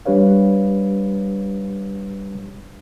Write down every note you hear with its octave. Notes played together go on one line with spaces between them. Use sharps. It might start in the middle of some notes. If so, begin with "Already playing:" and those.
G3 D4 G4 B4 C#5 F5